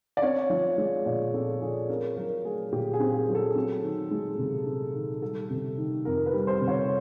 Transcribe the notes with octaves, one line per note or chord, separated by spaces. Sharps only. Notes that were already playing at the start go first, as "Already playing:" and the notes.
D5
C4 C#5
F3
G#3
A#2 D5
C4 A4
F3 G#4
C4 A#4
F#3 A#4
A3 G#4
A#2 G4
G#4
C4
G#4
F#3
A4
C4
D#3
G#3
C3
C4
D#3
G3 A4
C3
D#3
F2 A#4
B4
G3
C5
C3
C#5